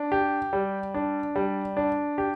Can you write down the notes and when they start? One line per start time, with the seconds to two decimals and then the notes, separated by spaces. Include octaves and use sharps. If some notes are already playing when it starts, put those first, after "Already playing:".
Already playing: D4
0.12 G4
0.53 G3
0.94 D4
1.36 G3
1.77 D4
2.18 G4